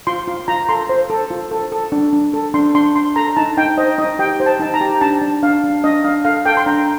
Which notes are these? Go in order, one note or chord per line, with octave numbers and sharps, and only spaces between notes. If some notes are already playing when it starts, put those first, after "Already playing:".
F4 C6
F4
F4 A#5
A4 C6
C5
A4
F4
A4
A4
D4
D4
A4
D4 C6
D4 C6
D4 C6
A4 A#5
D#4 A5
D#4 G5
C5 D#5
D#4 D#5
G4 G5
C5
A5
D#4 A5
A#5
G4
D4 A5
D4
D4 F5
D4
D4 D#5
D4 F5
A4 F5
A4 G5
C6
D4 A#5